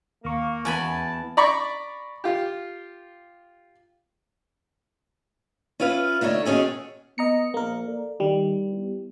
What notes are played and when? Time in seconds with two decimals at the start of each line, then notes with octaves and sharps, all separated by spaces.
0.25 D#2 A#3 C#6
0.65 E2 B4 G#5 A5 B5
1.37 D5 A#5 B5 C#6 D6
2.24 F4 G4
5.80 C#4 E4 F4 B4 F5
6.21 D3 A3 D#4 C#5
6.45 B2 D#3 C#4 G#4 A4
7.18 B3 D#5 A#5 C#7
7.54 A#1 A#3 A#4
7.87 A4 D5
8.20 D#3 G3
8.72 B3 E4 G4